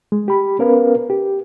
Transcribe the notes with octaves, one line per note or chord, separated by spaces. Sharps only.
G#3
G4 B5
B3 C#4 A#4 B4 F5
G4